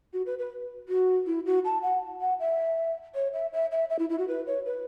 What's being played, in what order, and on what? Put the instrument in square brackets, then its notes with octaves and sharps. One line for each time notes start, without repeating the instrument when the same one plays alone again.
[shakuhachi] F#4
B4
B4
F#4
E4
F#4
A5
F#5
F#5
E5
C#5
E5
E5
E5
E5
E4
E4
F#4
B4
C#5
B4